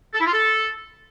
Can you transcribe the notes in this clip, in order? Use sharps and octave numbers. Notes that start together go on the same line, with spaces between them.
A4
E4
F4
A4